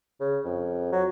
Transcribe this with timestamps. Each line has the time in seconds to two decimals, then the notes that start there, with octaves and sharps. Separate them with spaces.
0.20 C#3
0.44 F2
0.92 F#3